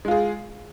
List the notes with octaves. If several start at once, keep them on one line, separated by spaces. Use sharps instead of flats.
G#3 F4 G#4